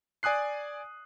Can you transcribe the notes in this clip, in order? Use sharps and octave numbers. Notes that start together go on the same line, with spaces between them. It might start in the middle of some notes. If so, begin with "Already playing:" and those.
D5 G#5 D#6 F#6 C7